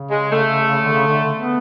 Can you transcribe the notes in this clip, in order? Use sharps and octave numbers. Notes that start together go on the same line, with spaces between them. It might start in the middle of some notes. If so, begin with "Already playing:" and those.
Already playing: C#3
G#3
A3
D3
C#3
D3
B3